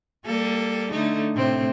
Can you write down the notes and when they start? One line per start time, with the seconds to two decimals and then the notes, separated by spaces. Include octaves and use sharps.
0.25 G3 A#3 A4
0.92 D3 A3 D#4
1.35 A2 C3 C4